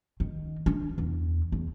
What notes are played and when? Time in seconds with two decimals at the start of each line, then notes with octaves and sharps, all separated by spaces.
0.20 D#3
0.66 D4
0.98 E2
1.52 E2